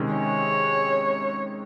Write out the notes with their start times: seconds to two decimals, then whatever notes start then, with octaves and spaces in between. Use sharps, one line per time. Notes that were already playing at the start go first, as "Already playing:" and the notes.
Already playing: C3 D#3 G#3 C#4
0.13 C#5